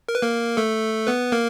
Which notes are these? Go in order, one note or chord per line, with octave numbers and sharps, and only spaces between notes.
A#4
B4
A#3 A#4
A3 A4
B3 B4
A#3 A#4